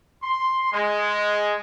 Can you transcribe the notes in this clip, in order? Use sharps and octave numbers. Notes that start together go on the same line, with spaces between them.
C6
G#3